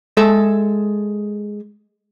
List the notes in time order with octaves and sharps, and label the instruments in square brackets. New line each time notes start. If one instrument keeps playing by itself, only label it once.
[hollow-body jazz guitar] G#3 A4 E5